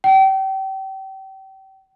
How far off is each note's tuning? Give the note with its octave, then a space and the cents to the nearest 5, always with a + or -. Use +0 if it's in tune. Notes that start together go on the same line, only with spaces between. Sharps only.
G5 -35